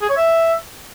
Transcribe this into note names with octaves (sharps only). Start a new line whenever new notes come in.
G#4
C#5
E5